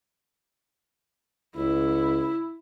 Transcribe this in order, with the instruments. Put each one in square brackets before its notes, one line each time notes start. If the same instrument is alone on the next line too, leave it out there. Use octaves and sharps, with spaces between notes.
[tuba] C#2 [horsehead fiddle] E4